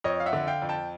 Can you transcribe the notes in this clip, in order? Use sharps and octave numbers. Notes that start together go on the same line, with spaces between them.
F2 C#5 D#5
F5
E5 F#5
D3
F5 G5
F2
G5 A5